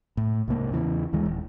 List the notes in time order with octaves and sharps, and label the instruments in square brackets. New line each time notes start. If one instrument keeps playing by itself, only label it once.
[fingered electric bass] A2
C2 G#2 A#3
E2 C#3 E3
D#2 E3 G#3
D#1